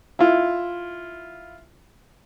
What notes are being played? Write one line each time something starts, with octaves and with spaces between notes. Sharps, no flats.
E4 F4